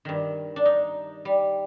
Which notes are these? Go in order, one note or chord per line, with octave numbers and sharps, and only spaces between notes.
G2 D#3
D4
D#4
G3